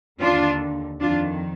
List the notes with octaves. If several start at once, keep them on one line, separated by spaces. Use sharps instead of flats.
D#2 D3 D4 F4
F2 D#3 D4 F4